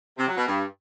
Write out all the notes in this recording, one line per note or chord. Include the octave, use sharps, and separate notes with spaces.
C3
F#3
B2
G2